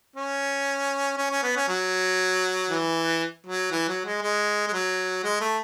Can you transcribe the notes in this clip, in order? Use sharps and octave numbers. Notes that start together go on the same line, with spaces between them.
C#4
C#4
C#4
B3
C#4
F#3
E3
F#3
E3
F#3
G#3
G#3
G#3
F#3
G#3
A3